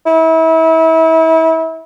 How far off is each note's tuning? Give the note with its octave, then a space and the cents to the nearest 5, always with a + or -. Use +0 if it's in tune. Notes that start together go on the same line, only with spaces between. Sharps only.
E4 -30